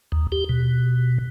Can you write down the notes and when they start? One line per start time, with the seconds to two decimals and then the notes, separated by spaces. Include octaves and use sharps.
0.12 D#2
0.32 G4
0.49 B2